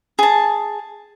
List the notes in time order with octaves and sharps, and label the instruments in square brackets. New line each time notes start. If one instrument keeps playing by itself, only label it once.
[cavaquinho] G#4 A5